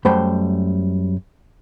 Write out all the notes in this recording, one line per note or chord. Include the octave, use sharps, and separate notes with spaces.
F#2 G3 A3 C5 G5 B5